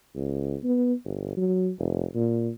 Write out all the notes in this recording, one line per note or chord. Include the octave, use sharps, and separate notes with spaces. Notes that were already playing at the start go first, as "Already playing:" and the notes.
C#2
B3
G1
F#3
F1
A#2